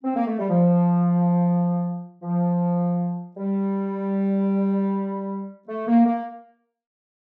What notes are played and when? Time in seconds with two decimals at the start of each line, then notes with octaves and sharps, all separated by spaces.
0.04 C4
0.16 A#3
0.27 A3
0.39 G3
0.50 F3
2.23 F3
3.37 G3
5.68 A3
5.88 A#3
6.06 A#3